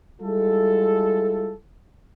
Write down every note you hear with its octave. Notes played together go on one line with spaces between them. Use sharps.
G3 G#3 E4 F4 A4